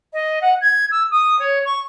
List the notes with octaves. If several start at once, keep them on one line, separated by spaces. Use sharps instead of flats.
D#5
F#5
G#6
E6
D#6
C#5
C#6